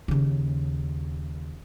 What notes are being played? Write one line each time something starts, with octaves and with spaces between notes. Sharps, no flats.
D#2 C#3